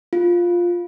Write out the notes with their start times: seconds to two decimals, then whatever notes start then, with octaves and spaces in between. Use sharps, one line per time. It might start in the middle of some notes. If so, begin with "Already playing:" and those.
0.13 F4